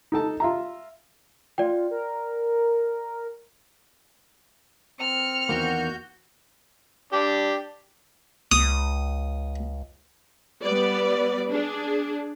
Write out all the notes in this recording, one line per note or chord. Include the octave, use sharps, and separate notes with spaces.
D#4 A4 A5
F4 E5 A#5
F4 D5 G5
A#4
C4 F6 C#7
E2 D#3 A#3 F#4 G6
D4 G4
C#2 D#6
G3 B3 B4 D5
D4 G#4